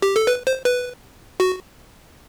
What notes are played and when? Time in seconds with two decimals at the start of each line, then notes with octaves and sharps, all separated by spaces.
0.02 G4
0.16 A4
0.27 B4
0.47 C5
0.65 B4
1.40 F#4